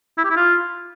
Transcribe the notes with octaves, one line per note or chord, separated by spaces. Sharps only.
E4
G4
E4
F4